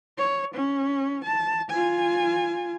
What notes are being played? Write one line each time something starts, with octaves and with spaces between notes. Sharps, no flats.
C#5
C#4
A5
F4 G#5